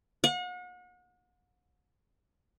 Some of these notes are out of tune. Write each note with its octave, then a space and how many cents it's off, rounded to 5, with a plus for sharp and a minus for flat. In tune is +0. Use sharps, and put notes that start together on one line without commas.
F#5 -40